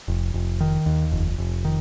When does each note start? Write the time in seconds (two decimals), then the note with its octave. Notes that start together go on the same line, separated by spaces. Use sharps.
0.08 F1
0.34 F1
0.60 D#3
0.86 D#2
1.12 F1
1.38 F1
1.65 D#3